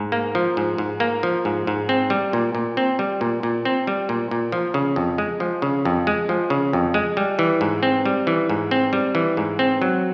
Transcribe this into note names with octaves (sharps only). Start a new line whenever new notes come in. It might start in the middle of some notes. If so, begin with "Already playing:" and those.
Already playing: G#2
A#3
F3
G#2
G#2
A#3
F3
G#2
G#2
C4
G3
A#2
A#2
C4
G3
A#2
A#2
C4
G3
A#2
A#2
F3
C#3
F2
G#3
F3
C#3
F2
G#3
F3
C#3
F2
G#3
G3
E3
G#2
C4
G3
E3
G#2
C4
G3
E3
G#2
C4
F#3